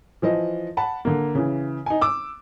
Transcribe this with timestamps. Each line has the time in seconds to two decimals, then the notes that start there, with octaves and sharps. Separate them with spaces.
0.22 E3 F3 D#5
0.77 F#5 A5 B5
1.05 D3 A#3
1.35 C#3 E3
1.86 D#4 G#5
2.01 D6 E6